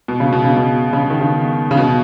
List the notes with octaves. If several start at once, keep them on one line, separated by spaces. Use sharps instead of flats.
B2
C#3
B2
C#3
B2
C#3
D#3
C#3
C#3
B2